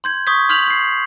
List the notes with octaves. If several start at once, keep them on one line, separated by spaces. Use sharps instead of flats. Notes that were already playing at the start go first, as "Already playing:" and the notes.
C6 G6 G#6
C#6 D#6 G6 G#6 B6
C6 F6 G6 B6 F7 F#7
G6 C7